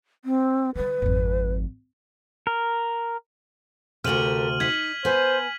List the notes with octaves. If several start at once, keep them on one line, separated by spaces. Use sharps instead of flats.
C4
D3 G3 B4
G#1 F2
A#4
D2 C3 G4 A4 A#4 F6 D#7 F#7
D#4 G#6 B6 F#7
B3 B4 C5 G#5